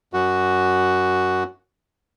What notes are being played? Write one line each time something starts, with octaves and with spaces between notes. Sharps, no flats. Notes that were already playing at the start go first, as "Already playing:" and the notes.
F#2 F#4